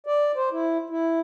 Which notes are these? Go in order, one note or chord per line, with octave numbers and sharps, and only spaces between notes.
D5
C5
E4
E4